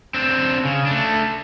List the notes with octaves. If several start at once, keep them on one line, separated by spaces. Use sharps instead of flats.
C4 D4
C#3
A3 D4